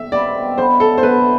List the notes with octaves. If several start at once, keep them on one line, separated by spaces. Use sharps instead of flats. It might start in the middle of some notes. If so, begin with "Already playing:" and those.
Already playing: E5
B2 G3 C4 G4 D5
D3 F#3 B3 E4 C5
A4
C5
D3 F#3 B3 E4 B4